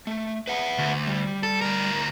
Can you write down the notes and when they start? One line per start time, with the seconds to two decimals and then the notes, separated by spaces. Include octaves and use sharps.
0.07 A3
0.47 B4 E5 F#5
0.78 D2
1.07 G3
1.43 A4
1.61 D2 A#4